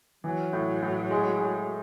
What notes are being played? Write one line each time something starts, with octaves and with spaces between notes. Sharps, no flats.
E3 F#3
A2
A2
G#3
G#3